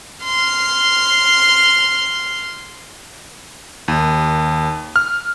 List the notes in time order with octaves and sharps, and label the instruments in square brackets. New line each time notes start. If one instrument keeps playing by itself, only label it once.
[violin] C6 F6
[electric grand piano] D#2
F6